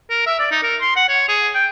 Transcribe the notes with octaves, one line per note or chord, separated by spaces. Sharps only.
A#4
E5
D5
D#4
A#4
C6
F#5
C#5
G#4
G5